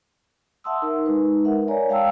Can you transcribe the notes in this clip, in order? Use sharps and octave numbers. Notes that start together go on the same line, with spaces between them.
E5 F#5 A5 C6 D#6 E6
D#4 A#4
G#3 D#4 B4
A#4 E5 F#5
A#4 C#5 D5 G#5 A#5
G#3 F5 G5 A5 A#5 E6